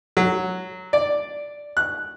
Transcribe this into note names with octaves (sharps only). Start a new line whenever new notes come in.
F#3
D5
F#6